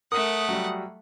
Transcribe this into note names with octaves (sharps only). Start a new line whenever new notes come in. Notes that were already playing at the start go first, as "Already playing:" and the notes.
A3 A#4 F#5 D#6
F#3 G3